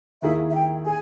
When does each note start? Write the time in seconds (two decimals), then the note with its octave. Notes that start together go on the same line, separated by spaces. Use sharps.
0.22 D#2 D#3 A#3 E4 G#4 E5
0.49 E5
0.54 G5
0.86 G#4 G#5